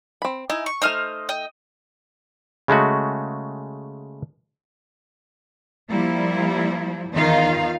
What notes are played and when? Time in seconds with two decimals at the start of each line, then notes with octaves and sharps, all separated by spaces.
0.22 C4 B5
0.50 D#4 E4 G#5
0.66 C#6
0.82 A3 D#4 C5 D#5 F6
1.29 D#5 G5
2.68 C#3 G#3 A3 F#4
5.88 F3 G3 A#3 E4
7.12 E2 D#3 D#4 F4 F5